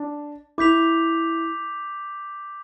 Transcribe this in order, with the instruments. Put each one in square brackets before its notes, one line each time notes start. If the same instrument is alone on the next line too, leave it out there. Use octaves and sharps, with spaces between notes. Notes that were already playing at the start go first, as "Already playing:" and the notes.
Already playing: [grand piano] D4
[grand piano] E4 [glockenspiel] D6 G6 B6 F7